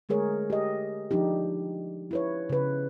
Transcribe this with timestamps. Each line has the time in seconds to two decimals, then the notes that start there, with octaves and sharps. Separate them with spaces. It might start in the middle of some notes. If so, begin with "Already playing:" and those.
0.09 D3 G#3 A3 G#4 A#4 C#5
0.50 G4 D#5
1.11 F3 D4 D#4 G4
2.11 E4 B4 C#5
2.50 C#3 B4